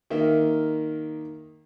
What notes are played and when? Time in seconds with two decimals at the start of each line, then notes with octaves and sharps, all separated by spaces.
0.10 D#3 A#3 E5